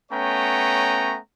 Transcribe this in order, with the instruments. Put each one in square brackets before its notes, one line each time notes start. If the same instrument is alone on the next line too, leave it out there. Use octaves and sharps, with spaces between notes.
[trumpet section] A3 B3 C#4 C#5 G5 A#5